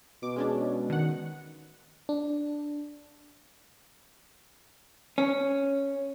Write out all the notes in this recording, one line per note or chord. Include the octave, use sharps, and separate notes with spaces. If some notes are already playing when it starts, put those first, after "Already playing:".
B2 D6
G#3 C#4 D4
D#3 F#5
D4
C#4